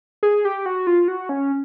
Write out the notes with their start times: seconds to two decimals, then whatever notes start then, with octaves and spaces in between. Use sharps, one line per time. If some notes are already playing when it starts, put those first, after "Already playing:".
0.23 G#4
0.45 G4
0.66 F#4
0.87 F4
1.08 F#4
1.29 C#4